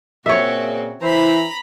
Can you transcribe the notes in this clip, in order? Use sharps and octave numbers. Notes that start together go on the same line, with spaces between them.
A#2 C#3 C4 F#4 C#5 E5
E3 E4 C5 A#5 B5